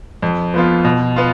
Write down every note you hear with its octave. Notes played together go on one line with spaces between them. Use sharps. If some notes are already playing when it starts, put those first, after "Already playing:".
F2
F3 B3 F4
B2
B3 F4